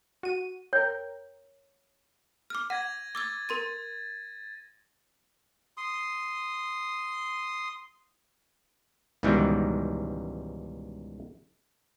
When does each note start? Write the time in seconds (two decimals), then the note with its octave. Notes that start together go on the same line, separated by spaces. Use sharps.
0.23 F#4 D#7
0.73 A#4 C#5 G5
2.50 D6 F6
2.70 F#5 G#6 A#6 D#7
3.15 D6 E6 G#6 A6
3.49 A#4 C6 D#7
5.77 C6 D#6
9.23 C#2 G#2 B2 D#3 E3 G3